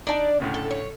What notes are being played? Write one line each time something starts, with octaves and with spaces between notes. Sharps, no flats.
D4 D#4 D5 A5
D2 A2 C#3
A4
C#5